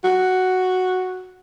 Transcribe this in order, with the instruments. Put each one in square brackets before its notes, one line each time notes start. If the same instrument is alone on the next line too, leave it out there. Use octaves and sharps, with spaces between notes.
[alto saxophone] F#4